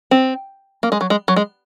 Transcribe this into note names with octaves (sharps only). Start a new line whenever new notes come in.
C4
A#3
G#3
F#3
G#3
F#3
G#3